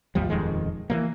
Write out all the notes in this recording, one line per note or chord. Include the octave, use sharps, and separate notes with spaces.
G#1 D#2 F3 G3
D#1 F2 D#3 G#3
E3 F3 A#3